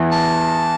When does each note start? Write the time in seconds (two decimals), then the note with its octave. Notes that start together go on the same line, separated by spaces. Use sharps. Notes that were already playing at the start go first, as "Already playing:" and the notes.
Already playing: E2 E3
0.11 A5